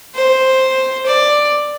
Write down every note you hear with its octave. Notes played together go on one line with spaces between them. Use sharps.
C5
D5